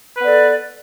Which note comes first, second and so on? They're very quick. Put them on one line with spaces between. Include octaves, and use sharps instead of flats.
B4 B3 D5 A4